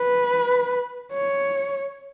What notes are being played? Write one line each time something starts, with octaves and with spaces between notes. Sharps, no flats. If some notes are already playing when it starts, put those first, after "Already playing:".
Already playing: B4
C#5